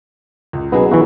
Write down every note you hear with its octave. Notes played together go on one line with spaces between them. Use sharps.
C#2
B2 F#3 B3 G#4
E3 E4 F#4